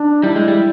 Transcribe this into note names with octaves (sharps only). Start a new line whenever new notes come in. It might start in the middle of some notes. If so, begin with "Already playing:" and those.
Already playing: D4
G3 E4
G#3
G3